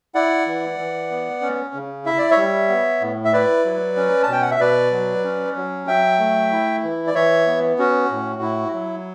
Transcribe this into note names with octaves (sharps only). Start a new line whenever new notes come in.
E4 D5 F#5
E3
E3
B3
C#4
C#3
E4 E5
D5
C#5 E5
G3
B3
A2
E5
E4 B4 D5
F#3
C#4
A5
B2 G5
F#5
E5
B2 B4 D5
F#3
C#4
F#3
F#3 E5 G5
A3
E4
E3
D5
E3 C#5 E5
B3
C#4 F#4
A2
E4
F#3